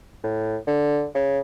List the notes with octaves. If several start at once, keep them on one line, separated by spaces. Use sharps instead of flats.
A2
D3
C#3